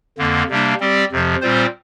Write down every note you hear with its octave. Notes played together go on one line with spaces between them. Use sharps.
F2 D3 A#3
C3 G3 A#3 D4
G3 C4 G4 D5
F2 C3 F3
A#2 G3 C4 F4 C5